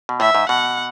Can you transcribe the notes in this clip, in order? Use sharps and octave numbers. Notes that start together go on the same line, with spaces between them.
B2
A2 E5
G#2
B2 F#5